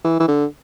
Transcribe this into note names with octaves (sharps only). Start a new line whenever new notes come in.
E3
E3
D3